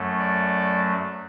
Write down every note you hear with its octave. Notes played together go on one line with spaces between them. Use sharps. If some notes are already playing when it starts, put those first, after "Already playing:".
Already playing: F#2 F#3 A3
D5